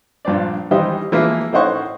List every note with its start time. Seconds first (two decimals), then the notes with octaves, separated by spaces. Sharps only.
0.25 A#1 G2 C5 D5
0.71 D#3 E3 G3 D#4 G4 C5
1.12 E3 F3 G#3 A#3 E4 F4
1.53 A2 C#4 D#4 C5 F#5 C#6